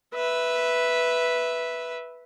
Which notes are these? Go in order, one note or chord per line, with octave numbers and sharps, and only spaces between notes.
B4 E5